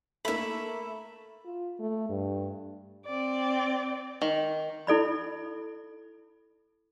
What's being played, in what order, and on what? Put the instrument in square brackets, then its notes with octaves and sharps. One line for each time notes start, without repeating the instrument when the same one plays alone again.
[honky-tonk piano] A3 A#3 [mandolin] E5 B5
[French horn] F4
A3
G2
[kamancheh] C4 D5
[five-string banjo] D#3
[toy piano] E4 A4 D5 B5